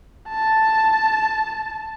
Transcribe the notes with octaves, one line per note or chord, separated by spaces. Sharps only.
A5